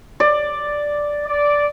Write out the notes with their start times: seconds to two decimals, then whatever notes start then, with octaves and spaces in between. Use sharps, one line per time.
0.20 D5
1.25 D5